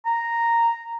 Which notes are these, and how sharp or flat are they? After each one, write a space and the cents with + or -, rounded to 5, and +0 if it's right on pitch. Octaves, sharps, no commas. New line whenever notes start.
A#5 -5